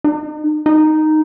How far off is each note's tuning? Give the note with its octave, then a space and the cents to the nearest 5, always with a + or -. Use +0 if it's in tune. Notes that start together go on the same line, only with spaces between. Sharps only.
D#4 -40
D#4 -5